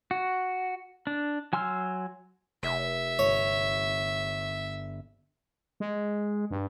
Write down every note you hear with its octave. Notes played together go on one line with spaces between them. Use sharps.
F#4
D4
F#3 G#5 C6 E6 F6
F1 E5
G1 C#5
G#3
G2